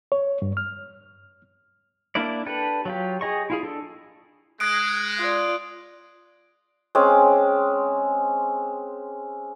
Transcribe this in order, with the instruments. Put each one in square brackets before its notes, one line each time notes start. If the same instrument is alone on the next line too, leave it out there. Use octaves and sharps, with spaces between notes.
[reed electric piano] C#5
G2
F6
[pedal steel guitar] A#3 D4 E4 D5
D4 G4 A4 B4
F#3 F4 G4
G4 G#4 D#5 C#6
E4 F4 G#4
D4 A4
[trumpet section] G#3 [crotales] D#6 F#6 D7
[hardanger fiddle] F4 D5
[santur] G#3 C4 C#4 D6